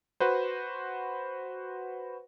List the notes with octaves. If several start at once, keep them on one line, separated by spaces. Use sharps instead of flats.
F#4 B4 C5